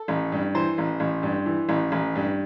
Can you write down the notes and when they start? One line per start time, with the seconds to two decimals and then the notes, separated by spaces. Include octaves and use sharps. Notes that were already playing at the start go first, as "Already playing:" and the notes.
Already playing: A4
0.08 A1
0.32 G2
0.55 E3 C5
0.78 A1
1.00 A1
1.23 G2
1.46 E3
1.69 A1
1.92 A1
2.15 G2